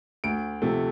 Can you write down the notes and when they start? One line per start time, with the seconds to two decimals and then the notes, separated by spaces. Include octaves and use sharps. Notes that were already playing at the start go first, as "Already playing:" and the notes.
0.24 D2 D7
0.62 C3 F3 A3